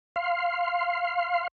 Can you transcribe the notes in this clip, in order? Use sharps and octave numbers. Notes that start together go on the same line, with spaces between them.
F5 C6